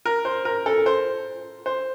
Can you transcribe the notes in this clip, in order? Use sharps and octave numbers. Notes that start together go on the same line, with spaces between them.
A#4
C5
A#4
A4
C5
C5